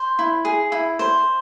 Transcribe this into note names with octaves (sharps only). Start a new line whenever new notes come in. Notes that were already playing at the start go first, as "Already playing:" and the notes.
Already playing: C5
E4
G#4
E4
C5